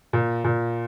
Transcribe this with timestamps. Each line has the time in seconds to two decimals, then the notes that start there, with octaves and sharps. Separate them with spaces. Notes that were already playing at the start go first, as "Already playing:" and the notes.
0.13 A#2
0.44 A#2